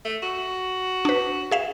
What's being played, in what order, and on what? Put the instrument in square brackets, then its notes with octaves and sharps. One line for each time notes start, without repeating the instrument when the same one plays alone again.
[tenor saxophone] A3
F#4
[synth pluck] D4 B4
G#4 E5 F5